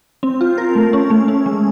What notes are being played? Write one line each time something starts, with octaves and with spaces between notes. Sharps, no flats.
C4
F4
A#4
A3
C#4
A3
C#4
G#3